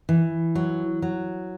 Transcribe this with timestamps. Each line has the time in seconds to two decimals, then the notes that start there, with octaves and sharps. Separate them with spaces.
0.09 E3
0.55 F#3
1.02 F#3